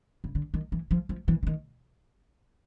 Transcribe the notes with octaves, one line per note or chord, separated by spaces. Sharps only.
C#3
D3
D#3
E3
F3
F3
E3
D3
D#3